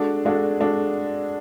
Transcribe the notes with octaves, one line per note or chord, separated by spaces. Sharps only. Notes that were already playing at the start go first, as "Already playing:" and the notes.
Already playing: G#3 D4 F#4 A4
G#3 D4 F#4 A4
G#3 D4 F#4 A4